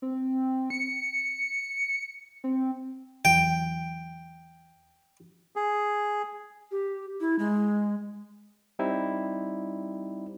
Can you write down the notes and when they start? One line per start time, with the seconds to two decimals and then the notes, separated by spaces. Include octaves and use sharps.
0.02 C4
0.70 C#7
2.44 C4
3.25 E2 E3 F#3 G5
5.56 G#4
6.72 G4
7.21 E4
7.39 G#3
8.79 G3 C4 D#4 E4